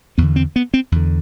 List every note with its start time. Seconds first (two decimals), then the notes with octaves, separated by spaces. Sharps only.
0.18 E2 D3 B3
0.36 C4
0.56 B3
0.74 C4
0.92 E2 D3